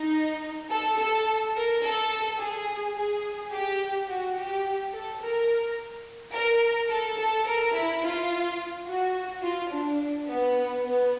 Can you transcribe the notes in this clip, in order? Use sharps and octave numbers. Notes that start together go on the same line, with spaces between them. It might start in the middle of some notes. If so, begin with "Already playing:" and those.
Already playing: D#4
A4
A4
A#4
A4
G#4
G#4
G4
F#4
G4
A4
A#4
A#4
A4
A4
A#4
E4
F4
F#4
F4
D4
B3
B3